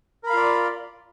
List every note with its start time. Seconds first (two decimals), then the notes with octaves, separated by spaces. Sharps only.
0.23 A#4
0.27 B5
0.30 F5
0.33 F4
0.37 D5